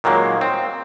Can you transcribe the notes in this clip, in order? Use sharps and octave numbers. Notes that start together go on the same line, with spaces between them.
A#2 D#3 F#3 G#3 A#3
C4